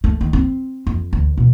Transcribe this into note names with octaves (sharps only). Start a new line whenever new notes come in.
A3
D#3
C4
F2
D2
B2